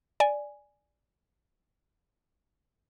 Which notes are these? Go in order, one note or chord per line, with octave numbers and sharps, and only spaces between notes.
D5 G#5